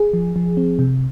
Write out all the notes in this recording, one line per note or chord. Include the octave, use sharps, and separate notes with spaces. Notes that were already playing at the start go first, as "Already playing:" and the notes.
Already playing: G#4
F3
F3
C4
C3